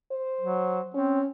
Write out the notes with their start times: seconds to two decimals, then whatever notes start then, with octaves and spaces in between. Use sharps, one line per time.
0.12 C5
0.41 F#3
0.94 C4 C#4